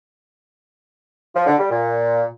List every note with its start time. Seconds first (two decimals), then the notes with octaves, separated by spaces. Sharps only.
1.35 F3
1.47 D3
1.58 G3
1.70 A#2